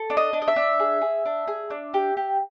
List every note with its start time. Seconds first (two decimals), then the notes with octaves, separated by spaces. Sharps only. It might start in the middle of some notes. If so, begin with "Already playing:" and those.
Already playing: A4
0.10 D4
0.17 D#5
0.33 D4
0.42 D#5
0.48 E5
0.56 D4
0.80 G#4
1.01 G#4
1.26 D4
1.47 G#4
1.70 D4
1.94 G4
2.17 G4